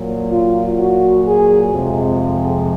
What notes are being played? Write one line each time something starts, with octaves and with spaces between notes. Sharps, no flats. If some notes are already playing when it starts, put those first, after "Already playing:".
Already playing: A#2 F#3
F4
F#4
G#4
F2 C3 F3 G#3